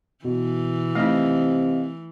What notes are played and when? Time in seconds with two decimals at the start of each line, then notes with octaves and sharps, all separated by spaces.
0.25 B2 E3
0.95 C3 A3 D#4 D#5 F5